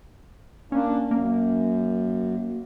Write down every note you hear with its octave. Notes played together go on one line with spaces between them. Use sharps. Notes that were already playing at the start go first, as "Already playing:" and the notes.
A#3 C#4 D4
F#2 A#3